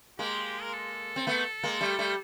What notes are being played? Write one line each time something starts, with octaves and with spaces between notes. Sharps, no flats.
G#3 A#3 G4
A#4
A4
C4
A3 B3
G#3 A#3
G3 A3
G3 A3